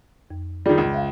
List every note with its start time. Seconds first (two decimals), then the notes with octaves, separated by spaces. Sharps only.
0.30 F2
0.66 D#3 G3 F4 G#4 D5
0.78 C#2
0.94 E5 F5